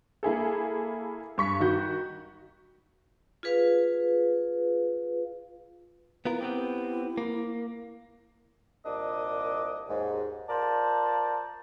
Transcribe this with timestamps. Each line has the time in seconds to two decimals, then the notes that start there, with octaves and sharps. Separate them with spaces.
0.23 A#3 E4 G#4 A4
1.38 G2 C#6 B6
1.60 D#3 F#4 G6
3.43 F4 G#4 B4 F5
6.25 B3 E4 F4 A#4
6.41 B3 C4 G4
7.18 A#3
8.85 C2 A#2 D4 D#5 D6 D#6
9.89 D#2 G#2
10.49 F4 A#4 C5 D5 A5